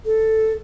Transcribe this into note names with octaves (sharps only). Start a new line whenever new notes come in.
A4